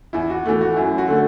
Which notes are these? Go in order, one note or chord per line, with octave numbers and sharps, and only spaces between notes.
E2 E4
F#4
E3 A3
F#4
F#2 E4
F#4
D3 A3